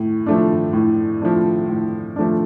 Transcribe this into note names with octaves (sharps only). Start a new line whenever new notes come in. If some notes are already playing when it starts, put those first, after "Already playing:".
Already playing: A2
F3 A3 D4
A2
F3 A3 D4
A2
F3 A3 D4